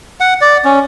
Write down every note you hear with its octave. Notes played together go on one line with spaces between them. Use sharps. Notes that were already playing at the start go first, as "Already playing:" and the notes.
F#5
D5
C#4